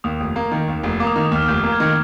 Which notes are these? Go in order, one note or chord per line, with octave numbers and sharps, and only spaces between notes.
D#2 D#6
F1
A#3
D#3
D#2
F1
A#3 D6
D#6
D#3 D6
D#6
D#2 F6
F1 G6
A#3
G#6
D#3